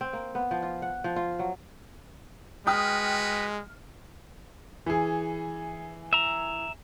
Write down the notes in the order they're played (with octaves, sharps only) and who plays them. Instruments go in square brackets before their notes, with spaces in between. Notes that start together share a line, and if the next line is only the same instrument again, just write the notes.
[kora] C4
A#3
B3
F3
F4
F#5
F3
F4
F#3
[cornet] G#3 [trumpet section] F#4 B4 [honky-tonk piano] G5 D#6 F6
[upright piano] E3 G#4
[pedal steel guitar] E5 A#5